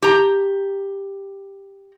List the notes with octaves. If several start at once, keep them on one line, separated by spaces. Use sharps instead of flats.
G4 A#5